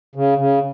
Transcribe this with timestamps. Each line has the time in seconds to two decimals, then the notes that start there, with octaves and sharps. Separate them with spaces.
0.16 C#3
0.38 C#3